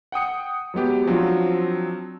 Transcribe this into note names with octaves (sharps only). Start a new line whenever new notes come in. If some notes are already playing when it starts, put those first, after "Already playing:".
F#5 G5 D#6 C#7
F#3 G#3 B3 G4
F3 F#3 C4 D4 F4